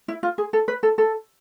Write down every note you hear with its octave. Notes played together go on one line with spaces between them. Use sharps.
E4
F4
G#4
A4
B4
A4
A4